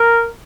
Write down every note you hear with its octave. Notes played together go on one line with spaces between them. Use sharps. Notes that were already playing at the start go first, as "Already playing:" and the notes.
Already playing: A#4